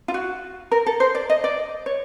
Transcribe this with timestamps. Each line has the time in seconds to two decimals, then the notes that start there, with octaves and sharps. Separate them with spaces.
0.08 F4
0.14 F#4
0.71 A#4
0.86 A4
1.00 C5
1.15 D5
1.30 D#5
1.44 D5
1.86 C#5